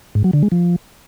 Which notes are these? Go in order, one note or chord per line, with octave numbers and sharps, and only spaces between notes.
G#2
F#3
D3
G#3
F3